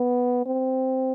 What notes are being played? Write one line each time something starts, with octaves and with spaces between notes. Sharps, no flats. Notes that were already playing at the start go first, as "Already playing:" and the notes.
Already playing: B3
C4